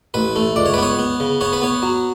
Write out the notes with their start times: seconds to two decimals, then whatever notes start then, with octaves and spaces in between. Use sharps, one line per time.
0.14 A1 B4
0.36 A3
0.56 C#2 D5
0.66 C#5
0.74 B4
0.78 B3 C#5
0.99 B3
1.20 C#3
1.41 B3 C#5
1.53 B4
1.62 B3 C#5
1.82 F#3